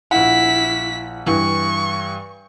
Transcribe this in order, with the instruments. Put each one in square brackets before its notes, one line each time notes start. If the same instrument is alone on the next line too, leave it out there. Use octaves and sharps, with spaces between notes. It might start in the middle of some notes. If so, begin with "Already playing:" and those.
[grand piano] A#1 F#5 [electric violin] E4 B6
[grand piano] G2 E3 [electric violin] C#6